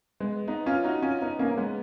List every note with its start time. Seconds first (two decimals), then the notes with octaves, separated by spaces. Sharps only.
0.20 G#3 B3
0.48 B3 D#4
0.66 C#4 F4
0.84 D#4 F#4
1.02 C#4 F4
1.22 B3 D#4
1.39 A#3 C#4
1.51 A#3
1.57 G#3 B3